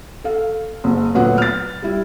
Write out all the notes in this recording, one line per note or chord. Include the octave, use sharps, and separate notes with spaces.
A4 F5
F#1
D2 A#2 F#3 B3 F#5
F6 A6
G3 E4